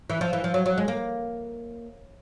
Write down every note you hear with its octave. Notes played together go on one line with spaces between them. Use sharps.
E3
F3
E3
F3
F#3
F#3
G#3
A#3